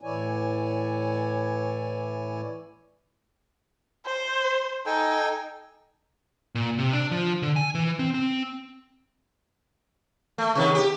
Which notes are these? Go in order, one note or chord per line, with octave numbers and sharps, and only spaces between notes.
A2 E3 E4 C#5 D5 G#5
C5
D#4 A4 G5 G#5
A#2
C3
D4
F3
D3
G#5
E3
C4
C4
A3
C3 D#3 B3
G4